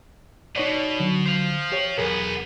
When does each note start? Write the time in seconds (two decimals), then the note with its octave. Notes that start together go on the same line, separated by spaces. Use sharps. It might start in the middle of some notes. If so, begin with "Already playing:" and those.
0.56 B2 D#4 C#5 D5
1.00 D3 F#3
1.26 C5 F5
1.72 G4 C#5
1.98 B1 E2 B3 G#4 A#4